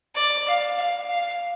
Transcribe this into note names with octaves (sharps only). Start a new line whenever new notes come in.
D5
F5
F5
F5